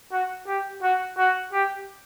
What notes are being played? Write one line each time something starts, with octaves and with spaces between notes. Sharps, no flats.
F#4
G4
F#4
F#4
G4